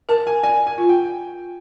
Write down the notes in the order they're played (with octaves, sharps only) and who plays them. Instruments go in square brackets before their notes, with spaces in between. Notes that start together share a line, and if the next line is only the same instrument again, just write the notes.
[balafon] A#4 [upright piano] A5
[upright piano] G#5
[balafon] D5 [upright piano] G#5
[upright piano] G#5
[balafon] F4
[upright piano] G5